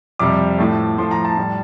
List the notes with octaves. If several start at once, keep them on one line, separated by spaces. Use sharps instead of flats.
F2 C3 G3 D6
A2 F3 A3
A2 F3 A3 C6
A#5
A5
A2 G3